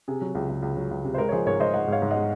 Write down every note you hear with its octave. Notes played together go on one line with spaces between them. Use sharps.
C3 G#4
F#3
C#2
C#2
C#2
F#3
C#2
C3
C5
G#3 A#4
C#5
F3 G#4 C5
G#2 A#4 C#5
G#2 C5 D#5
G#2 D#5 F#5
G#2 C#5 F5
G#2
D#5 F#5
G#3